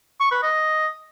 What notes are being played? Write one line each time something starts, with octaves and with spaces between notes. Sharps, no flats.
C#6
B4
D#5